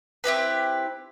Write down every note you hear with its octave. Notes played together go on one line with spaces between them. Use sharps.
C4 E4 G4 B4